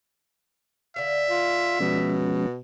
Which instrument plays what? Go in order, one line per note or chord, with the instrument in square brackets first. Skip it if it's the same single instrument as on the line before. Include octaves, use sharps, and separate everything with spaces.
[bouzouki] D3 F5 [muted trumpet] E5
[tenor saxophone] F4
[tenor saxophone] B2 [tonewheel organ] F3 G#3 C#4